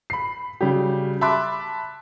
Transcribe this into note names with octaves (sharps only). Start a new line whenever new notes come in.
B5 C7
C#3 F#3 G3 G4
E5 A5 B5 C6 D6 F#6